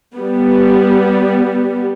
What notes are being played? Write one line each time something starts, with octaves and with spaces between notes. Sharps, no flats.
G3 B3